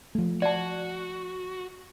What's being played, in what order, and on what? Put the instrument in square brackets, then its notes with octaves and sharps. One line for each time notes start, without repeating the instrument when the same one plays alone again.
[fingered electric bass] F3 A3
[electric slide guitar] F#4 [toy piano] D5 A5